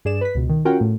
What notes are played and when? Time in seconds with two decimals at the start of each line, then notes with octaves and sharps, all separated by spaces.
0.05 G2 G#4 D5 E7
0.21 B4 B6
0.35 C#2 B2
0.49 D#3
0.65 C#4 F4 F#4 A#4 F#5 G5
0.80 A2 A3